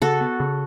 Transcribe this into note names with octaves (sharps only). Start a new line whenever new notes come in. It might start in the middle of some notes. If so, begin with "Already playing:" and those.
C#3 F#4 A4
B3
C#3